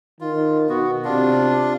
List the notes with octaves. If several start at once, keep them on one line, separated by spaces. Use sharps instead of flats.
D#3 F4
B2 B3 F#4
C3 D4 F4